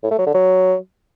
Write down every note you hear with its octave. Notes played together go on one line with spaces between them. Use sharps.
A2
A3
F#3
D3
F#3